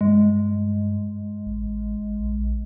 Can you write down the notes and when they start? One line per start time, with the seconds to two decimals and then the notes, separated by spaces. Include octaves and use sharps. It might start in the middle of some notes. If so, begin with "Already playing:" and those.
0.01 G2 G#3
1.46 A1
2.19 A#1